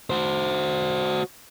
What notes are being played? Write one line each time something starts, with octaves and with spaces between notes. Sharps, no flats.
F#4 C5